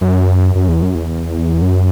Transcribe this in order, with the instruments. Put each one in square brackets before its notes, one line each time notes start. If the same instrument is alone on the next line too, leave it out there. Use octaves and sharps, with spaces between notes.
[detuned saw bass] F#2
F#2
E2
F#2
E2
F#2